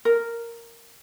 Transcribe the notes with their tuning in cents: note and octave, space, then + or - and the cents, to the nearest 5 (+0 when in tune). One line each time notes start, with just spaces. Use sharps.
A#4 -5